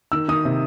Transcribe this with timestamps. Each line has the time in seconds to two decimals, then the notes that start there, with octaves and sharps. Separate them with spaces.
0.12 D#3 E6
0.28 D#3 D#6
0.45 C3